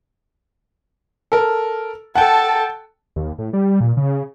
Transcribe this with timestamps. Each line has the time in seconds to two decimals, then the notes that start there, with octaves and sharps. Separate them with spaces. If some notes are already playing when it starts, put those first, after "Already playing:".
1.32 A4 A#4
2.15 A4 F#5 G5 A5
3.16 D#2
3.38 A2
3.53 G3
3.81 A#2
3.97 C#3